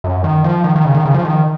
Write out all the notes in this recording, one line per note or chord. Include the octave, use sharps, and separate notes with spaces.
F#2
D#3
F3
D#3
D#3
C#3
D#3
C#3
F3
D#3